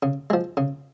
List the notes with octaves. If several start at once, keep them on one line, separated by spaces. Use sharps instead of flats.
C#3
F3 G#3
C#3